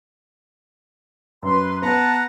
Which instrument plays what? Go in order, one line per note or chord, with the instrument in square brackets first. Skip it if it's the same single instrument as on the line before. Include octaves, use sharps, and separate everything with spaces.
[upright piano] F#2 [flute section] B4 C6
[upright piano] B3 [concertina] B4 F#5 A#5 [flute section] A5 F#6